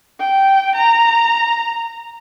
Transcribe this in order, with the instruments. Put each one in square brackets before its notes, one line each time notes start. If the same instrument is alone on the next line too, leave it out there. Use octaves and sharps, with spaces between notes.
[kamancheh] G5
A#5